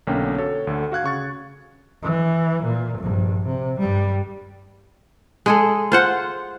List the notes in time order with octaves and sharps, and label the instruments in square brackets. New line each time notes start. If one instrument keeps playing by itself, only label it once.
[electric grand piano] B1 D3 A#3 C#4 G5
F#4 A4 C#5
D2 D3
F#4 F5 F#6 G#6
C#3 C#6 A6
[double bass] E3
A#2
A#1 G2
C3
G2 G3
[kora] G#3 G#4 A4
F4 C5 F#5